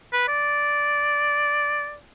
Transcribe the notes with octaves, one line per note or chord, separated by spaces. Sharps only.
B4
D5